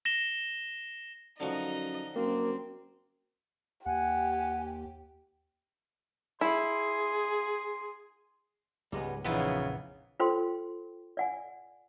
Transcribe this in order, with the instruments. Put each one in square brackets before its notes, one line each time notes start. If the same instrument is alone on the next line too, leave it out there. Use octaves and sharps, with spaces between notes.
[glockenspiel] A#6 E7 G7
[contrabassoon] F#2 [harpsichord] D3 F3 F#4 [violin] D#4 D#5
[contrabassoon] F#2 [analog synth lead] A#3 [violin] C4
[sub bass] D#2 [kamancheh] G4 [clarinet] F#5 [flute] G#5
[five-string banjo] E4 [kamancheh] G#4 [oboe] C6
[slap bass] C#2 G#2 [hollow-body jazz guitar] G3 G#3 B3
[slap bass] A#1 F2 [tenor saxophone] C#3 [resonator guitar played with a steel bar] E3 B3 [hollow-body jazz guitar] F3 D#4 F4
[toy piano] F4 A4 C5 G5 C6
D5 F#5 G#5